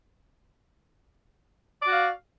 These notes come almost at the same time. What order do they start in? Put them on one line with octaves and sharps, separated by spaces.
D5 F#4 F5